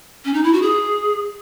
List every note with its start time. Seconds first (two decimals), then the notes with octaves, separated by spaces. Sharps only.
0.25 C#4
0.34 D#4
0.43 E4
0.53 F#4
0.62 G#4